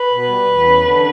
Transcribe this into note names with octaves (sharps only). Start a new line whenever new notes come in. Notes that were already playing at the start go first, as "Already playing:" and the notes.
Already playing: B4
B2
G3
E2
C#4
D3